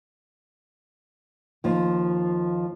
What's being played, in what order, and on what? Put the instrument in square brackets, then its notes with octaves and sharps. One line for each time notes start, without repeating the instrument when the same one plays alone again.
[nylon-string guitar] D#2 F3